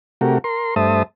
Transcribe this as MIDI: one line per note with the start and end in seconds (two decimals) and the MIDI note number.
0.21 0.38 48
0.21 0.38 57
0.21 0.38 66
0.21 0.38 67
0.21 0.38 70
0.44 0.75 70
0.44 0.75 84
0.76 1.03 43
0.76 1.03 57
0.76 1.03 72
0.76 1.03 76
0.76 1.03 81
0.76 1.03 87